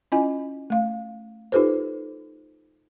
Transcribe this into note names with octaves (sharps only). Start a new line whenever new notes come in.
C#4 E4 F4 D#5 G#5
A3 F5
D#4 F4 G4 A4 B4 C5